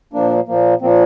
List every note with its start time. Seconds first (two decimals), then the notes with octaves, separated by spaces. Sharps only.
0.13 A#2 F3 A#3 D4
0.47 A#2 F3 A#3
0.81 A#2 F3 A#3 C4